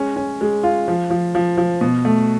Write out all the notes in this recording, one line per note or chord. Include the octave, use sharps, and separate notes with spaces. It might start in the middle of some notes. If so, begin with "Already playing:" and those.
Already playing: G#3 C#4
C#4
G#3
F4
F3
F3
F3
F3
B2
A3